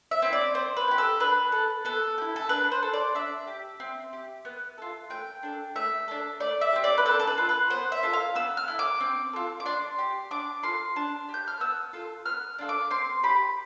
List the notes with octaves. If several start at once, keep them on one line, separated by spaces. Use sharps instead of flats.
E5
C4 E4
D5
C4 C5
B4
E4
G4
A4
D4 B4
A4
B3 A4
G4
E4
A4
D4 B4
C5
A4
D5
D4 E5
G4
C4
G4
B3
F4 A4
A3 G5
D4 A4
A3 E5
D4 A4
A3 D5
E5
C4 G4
D5
B4
C4 A4
A4
B4
F4 A4
B4
B3 C5
E5
F4 A4
F5
B3 E6
F6
E4 A4
D6
C4
F4 A4
D6
D4 C6
G4
D4 D6
F4 A4 C6
D4 A5
G4
G6
F6
B3 E6
F4 A4
B3 F6
D4 F4 A4
D6
C4 C6
G4 B5